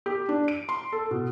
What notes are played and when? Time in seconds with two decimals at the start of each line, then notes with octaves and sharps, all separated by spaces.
0.06 G4
0.29 D4
0.48 D7
0.69 C6
0.92 A4
1.11 B2